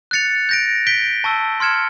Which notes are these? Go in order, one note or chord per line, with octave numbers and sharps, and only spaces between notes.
F#6 A6 C#7 F7
G6 A#6 D7
G6 B6 D7 G7
A5 C#6 E6
C6 F6 G#6 C#7 E7